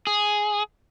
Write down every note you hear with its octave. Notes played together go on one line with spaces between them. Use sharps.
G#4